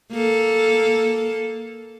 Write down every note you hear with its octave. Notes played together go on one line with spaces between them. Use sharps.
A#3 A4